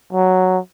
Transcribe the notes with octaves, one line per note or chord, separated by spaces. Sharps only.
F#3